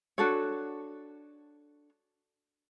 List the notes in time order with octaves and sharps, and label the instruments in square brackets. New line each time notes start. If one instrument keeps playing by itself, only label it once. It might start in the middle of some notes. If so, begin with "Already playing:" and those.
[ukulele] D4 F#4 A4 C#5